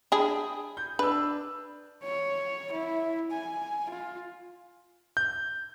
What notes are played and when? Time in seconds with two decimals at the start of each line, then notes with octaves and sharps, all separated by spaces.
0.12 D4 G#4 G5 B5 D#6
0.77 G6
0.99 D4 B4 E6
2.03 C#5
2.72 E4
3.31 G#5
3.90 F4
5.17 G6